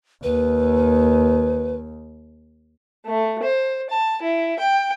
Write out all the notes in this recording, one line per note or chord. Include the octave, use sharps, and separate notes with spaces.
D#2 B4
A3
C5
A5
E4
G5